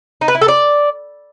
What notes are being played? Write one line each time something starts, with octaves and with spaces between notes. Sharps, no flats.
D#4
B4
E4
A4
D5